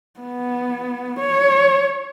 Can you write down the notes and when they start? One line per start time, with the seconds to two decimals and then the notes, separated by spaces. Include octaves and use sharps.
0.20 B3
1.19 C#5